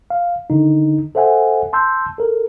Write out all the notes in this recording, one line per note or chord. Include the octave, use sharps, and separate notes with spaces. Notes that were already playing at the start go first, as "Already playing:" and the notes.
F5
D3 D#3 D#4
A4 C5 E5 F#5 G#5
A5 C6 E6 G6
A4 A#4